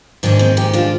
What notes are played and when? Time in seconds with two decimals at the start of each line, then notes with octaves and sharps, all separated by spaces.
0.23 G#2 D#3 G#3 D4
0.39 C4 D#4
0.57 D#4 G4
0.74 D4 F4